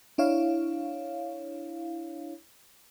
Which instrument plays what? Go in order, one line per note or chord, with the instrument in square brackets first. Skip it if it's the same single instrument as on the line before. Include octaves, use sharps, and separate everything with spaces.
[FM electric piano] D4 E4 C#5 F5